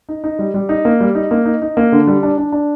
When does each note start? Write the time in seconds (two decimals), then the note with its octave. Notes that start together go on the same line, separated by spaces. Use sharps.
0.09 D#4
0.24 D#4
0.39 G3
0.54 G3
0.69 D#4
0.85 A#3
1.01 G3
1.15 D#4
1.31 A#3
1.45 D#4
1.62 D#4
1.77 A#3
1.92 D3
2.07 G3
2.23 D4
2.38 D4
2.52 D4